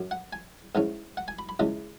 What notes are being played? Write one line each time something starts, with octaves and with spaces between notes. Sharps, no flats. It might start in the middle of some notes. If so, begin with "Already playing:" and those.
Already playing: F#2 F#3
F#5
G#5
G#2 E3 C#4
F#5
G#5
B5
B5
C#2 C#3 E3 G#3